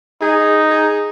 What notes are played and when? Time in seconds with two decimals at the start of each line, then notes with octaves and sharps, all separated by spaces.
0.21 D#4 G#4
0.71 G#4